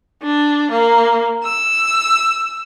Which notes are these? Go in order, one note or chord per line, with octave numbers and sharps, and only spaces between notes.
D4
A#3
E6